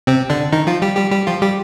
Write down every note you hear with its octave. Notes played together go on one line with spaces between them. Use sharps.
C3 C4
D3 D4
D#3 D#4
F3 F4
G3 G4
G3 G4
G3 G4
F3 F4
G3 G4